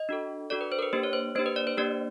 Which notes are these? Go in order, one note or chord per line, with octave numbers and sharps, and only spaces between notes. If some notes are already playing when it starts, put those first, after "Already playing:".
Already playing: D#5
D4 F#4 A4
D4 F#4 A4 D5
B4
C5
A#4
B4
A#3 D4 G4 C5
C#5
C5
A#3 D4 G4 C5
B4
D5
C5
A#3 D4 G4 D5